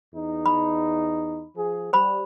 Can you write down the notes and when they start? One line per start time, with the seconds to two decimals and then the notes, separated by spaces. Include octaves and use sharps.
0.14 E2 D#4
0.46 B5
1.56 F3 G#4
1.93 G3 C5 B5